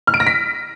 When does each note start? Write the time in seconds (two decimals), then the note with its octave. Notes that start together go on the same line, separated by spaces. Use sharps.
0.07 F6
0.14 D7
0.20 A#6
0.27 B6